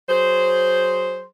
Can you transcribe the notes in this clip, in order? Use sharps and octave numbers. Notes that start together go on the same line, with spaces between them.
F#3 G#4 C5